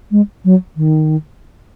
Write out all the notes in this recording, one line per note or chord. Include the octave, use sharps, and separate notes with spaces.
G#3
F#3
D#3